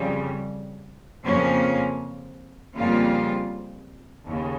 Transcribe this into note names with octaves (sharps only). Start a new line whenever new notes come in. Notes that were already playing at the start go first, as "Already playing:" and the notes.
Already playing: F2 C#3 G3
F2 C#3 F3 A#3 C#4
F2 C#3 G3 A#3 F4
D#2 C#3